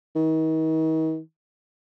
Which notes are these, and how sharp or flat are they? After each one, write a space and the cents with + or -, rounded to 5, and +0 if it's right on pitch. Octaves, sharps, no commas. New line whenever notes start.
D#3 +40